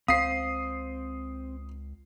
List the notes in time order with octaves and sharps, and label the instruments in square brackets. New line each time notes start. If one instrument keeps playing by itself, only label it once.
[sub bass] C#2 [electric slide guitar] C4 C5 [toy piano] F5 [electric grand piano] D#6 C7